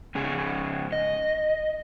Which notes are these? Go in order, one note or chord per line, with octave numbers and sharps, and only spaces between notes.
G#2 C#3 G#4
D#5